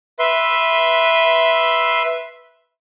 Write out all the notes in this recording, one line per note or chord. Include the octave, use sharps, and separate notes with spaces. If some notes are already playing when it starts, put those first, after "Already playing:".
B4 E5 C6